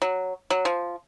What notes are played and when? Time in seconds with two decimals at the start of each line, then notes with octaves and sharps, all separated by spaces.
0.02 F#3
0.50 F#3
0.65 F3